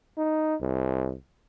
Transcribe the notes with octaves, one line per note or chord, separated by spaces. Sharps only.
D#4
C2